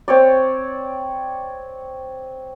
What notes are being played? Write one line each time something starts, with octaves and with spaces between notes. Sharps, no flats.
C4 C#5 D5